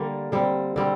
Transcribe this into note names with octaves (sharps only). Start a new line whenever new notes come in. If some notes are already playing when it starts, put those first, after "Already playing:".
Already playing: D3 G3 A#3
D3 G3 C4
D3 G3 C4